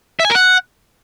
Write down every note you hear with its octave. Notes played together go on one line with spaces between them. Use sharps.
E5
G#5
A#4
F#5